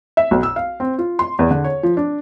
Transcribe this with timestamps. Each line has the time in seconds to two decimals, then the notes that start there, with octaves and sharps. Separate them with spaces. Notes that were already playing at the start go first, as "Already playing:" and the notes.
0.17 E5
0.31 B1
0.43 E6
0.56 F5
0.80 C4
0.98 F4
1.19 C6
1.39 E2
1.51 D3
1.64 C#5
1.83 F3
1.97 D4